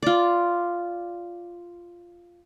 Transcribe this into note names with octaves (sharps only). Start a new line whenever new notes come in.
F4 D5